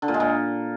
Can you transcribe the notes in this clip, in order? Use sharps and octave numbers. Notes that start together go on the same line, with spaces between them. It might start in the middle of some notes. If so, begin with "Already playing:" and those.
D3
A#2
G#3
A#2